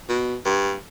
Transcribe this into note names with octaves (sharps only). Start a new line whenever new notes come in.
B2
G2